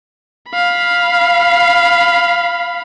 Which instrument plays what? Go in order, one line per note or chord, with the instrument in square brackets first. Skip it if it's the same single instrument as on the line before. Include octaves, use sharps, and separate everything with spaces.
[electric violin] F5 B5